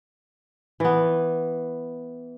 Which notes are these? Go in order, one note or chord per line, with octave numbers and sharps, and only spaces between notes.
E3 B3